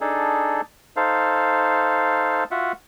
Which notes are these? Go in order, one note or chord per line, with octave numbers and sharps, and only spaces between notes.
D4 D#4 G#4 A4
D#4 A4 C5 F5
F4 F#4 E5 F#5